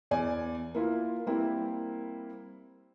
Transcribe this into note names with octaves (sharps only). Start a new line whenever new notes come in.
E2 D5 G#5
A#3 E4 F4
G3 A#3 C4 E4